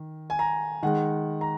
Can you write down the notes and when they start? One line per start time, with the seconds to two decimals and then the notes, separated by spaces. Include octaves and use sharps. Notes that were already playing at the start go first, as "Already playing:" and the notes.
Already playing: D#3
0.30 G#5
0.39 A#5
0.83 D#3 G#3 F#5
1.41 A#5